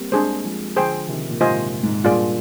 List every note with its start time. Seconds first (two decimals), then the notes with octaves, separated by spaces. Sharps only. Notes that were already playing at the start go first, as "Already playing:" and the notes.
Already playing: G3 A#3 C4
0.12 G#3 C4 D4 G#4 C5
0.45 F3 G#3
0.76 D3 F3 G#4 C5 G5
1.08 C3 D#3
1.29 A#2
1.41 G#2 C3 F4 C5 D#5 G#5
1.83 G#2
2.04 G2 A#2 F4 G#4 D5